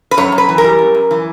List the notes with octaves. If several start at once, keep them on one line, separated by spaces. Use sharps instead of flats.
B4
F#2 C#5
F#2
B4
E3
A#4
G3
F#2
F#2
E3